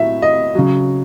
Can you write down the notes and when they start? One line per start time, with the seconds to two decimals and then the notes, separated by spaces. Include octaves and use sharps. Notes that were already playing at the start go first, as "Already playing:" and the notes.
Already playing: A2 F#3 E5
0.22 D#5
0.55 C#3 F#3